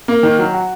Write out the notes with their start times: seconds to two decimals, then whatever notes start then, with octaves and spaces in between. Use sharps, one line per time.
0.08 A#3
0.23 D#3
0.39 F#3
0.54 F#4